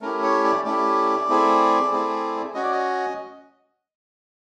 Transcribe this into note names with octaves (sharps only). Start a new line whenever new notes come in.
A3 C#4 E4 G4 A#4
C#5
D5
A3 C#4 E4 G4 D5
A3 C4 E4 G#4
A3 C4 E4 G#4
C#4 F#4 D#5
D5
D#5